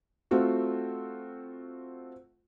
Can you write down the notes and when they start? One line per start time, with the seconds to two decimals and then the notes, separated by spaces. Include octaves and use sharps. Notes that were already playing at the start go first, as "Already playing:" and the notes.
0.31 A3 C4 F4 F#4